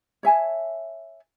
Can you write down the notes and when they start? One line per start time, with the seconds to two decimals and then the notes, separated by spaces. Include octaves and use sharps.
0.23 C#5 E5 G#5 A5